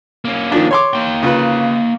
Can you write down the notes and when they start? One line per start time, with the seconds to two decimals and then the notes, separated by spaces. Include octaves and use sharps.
0.25 A#3 C#4
0.52 D#3 F3 D4
0.71 C#5 C6 D6
0.93 A#3 G5
1.23 C#3 F4 B4